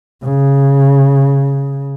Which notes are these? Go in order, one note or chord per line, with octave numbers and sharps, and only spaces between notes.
C#3